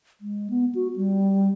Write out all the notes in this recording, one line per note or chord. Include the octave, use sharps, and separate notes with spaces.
G#3
B3
F#4
G3